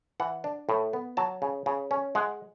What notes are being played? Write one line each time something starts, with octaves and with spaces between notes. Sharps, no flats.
E3 F#5
D4
A2
B3
F#3 A5
C#3
C#3
C#4
G#3 F#5